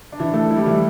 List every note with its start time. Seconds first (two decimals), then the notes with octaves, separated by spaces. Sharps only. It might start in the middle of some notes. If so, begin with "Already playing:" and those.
0.12 D4
0.20 E3 E4
0.33 A3 A4
0.51 E4
0.56 G3 G4
0.66 E3 E4